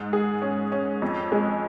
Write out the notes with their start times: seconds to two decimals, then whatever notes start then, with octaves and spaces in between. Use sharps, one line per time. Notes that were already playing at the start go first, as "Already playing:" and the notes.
Already playing: G#2
0.13 G#4
0.42 C#4
0.72 C#4
1.02 F2
1.32 G#3